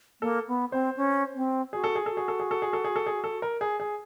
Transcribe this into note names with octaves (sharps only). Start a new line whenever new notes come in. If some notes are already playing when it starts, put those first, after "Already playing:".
A#3 A4
B3
C4 C5
C#4
C4
F#4 G#4
A4
G#4
F#4 A4
G#4
A4
G#4
A4
G#4
A4
G#4
A4
G#4
A4
A#4
G#4
G#4